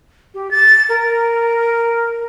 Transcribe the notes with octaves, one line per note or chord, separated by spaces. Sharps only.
G4
A6
A#4